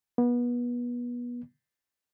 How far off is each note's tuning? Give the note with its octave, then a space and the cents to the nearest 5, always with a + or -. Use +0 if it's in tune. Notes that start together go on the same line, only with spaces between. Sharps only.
B3 -30